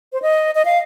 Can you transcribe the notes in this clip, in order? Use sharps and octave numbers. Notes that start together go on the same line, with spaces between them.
C5
D#5
D#5
F5